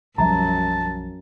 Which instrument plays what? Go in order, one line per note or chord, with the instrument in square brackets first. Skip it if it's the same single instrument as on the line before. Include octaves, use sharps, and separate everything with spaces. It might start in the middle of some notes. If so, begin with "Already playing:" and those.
[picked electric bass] B1 F3 G3 [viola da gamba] F#2 [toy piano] E5 A#5 [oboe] A5